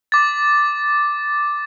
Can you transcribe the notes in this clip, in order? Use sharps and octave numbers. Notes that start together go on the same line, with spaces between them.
D6 A6